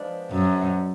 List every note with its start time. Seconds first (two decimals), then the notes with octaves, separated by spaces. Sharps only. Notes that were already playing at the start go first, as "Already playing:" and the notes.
Already playing: F3 G#3 B3 D4
0.32 F#2